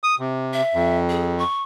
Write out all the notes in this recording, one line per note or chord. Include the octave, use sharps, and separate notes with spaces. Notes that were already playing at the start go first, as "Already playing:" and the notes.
D#6
C3
E5
F2
G#4
C#6